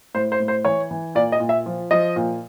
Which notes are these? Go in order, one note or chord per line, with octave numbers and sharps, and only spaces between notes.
A2 C5
C5
A2
C5
E3 C#5
E3
A#2 D5
D#5
A#2
E5
F3
F3 D#5
A#2